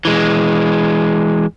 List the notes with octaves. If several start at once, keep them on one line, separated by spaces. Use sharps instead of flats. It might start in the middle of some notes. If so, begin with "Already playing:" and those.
E3 G#3